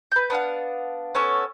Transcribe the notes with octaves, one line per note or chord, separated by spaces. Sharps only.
B4 G6
B3 D4 F5 F#5
B3 C#4 A4 C#5